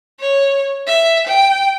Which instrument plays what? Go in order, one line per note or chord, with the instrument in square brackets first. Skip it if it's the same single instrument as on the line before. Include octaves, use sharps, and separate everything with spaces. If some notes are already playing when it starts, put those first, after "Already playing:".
[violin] C#5
E5
G5